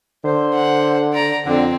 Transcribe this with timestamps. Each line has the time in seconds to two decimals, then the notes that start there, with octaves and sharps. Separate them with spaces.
0.25 D3 C5
0.54 F#5
1.13 D5 A#5
1.46 F2 D3 C4